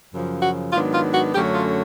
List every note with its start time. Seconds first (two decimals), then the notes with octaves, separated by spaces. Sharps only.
0.13 F#2 C#3 F3
0.43 F#4
0.73 G#2 D#3 F#3 B3 D4 F4
0.94 F4
1.14 F#4
1.34 F#2 D3 F#3 A3 C#4 G4
1.55 F4